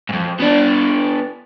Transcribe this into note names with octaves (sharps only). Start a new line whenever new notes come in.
F2 G#2
B3 D4